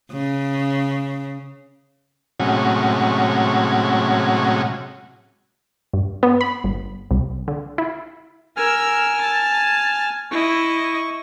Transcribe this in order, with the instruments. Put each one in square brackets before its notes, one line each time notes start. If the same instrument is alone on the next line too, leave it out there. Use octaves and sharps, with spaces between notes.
[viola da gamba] C#3
[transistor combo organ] A2 C3 F#3 G#3 C#4 F#4
[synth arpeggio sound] G2
B3
B5
G1
C2
D3
E4
[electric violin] A#4 E6 [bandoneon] G#5 F6
[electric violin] A5
[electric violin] E4 D#5 [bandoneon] C#6